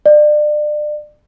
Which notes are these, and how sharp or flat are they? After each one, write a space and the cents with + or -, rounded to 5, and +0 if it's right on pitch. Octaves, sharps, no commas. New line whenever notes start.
D5 +30